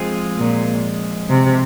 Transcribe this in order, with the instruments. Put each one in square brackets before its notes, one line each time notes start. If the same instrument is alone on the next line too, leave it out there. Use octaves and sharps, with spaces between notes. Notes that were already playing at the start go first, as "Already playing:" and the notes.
Already playing: [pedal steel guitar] F3 G#3 C4 F4 G#4
[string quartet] A#2
C3